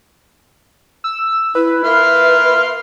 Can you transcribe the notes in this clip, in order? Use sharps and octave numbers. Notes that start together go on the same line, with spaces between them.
E6
E4 B4
A#3 E5 C6 F6